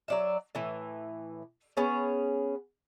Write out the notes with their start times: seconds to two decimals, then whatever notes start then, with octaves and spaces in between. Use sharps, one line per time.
0.08 F#3 D5 E5
0.55 A2 E3
1.77 B3 C#4 G#4 C#5